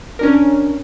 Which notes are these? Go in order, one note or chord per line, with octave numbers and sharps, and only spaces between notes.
C#4 D4 A#4